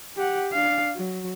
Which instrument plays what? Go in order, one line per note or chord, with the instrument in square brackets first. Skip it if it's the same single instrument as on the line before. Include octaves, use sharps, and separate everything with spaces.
[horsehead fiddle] G4 F#5
D4 F5
F#3